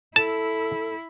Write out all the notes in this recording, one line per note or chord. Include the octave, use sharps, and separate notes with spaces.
E4 A4 A5